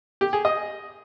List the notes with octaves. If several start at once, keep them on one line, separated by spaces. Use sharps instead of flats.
G4
G#4
D#5